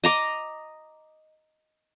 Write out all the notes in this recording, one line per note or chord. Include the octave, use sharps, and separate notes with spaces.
D#5 A#5 D6